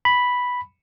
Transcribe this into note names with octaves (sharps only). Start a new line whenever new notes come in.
B5